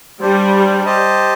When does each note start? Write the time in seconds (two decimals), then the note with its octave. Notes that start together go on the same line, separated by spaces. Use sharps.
0.20 G3 D4 G4 C5
0.86 G4 C5 D#5 A5